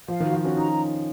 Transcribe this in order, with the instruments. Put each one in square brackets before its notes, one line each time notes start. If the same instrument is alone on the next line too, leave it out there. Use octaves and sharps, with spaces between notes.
[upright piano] F3 [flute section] F5
[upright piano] D#3 [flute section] F#4
[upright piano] F3
[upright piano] C#4 [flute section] F#4
[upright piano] D#4 [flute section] A#5